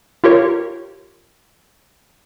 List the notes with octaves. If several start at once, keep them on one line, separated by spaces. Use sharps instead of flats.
F4 G4 A#4 C#5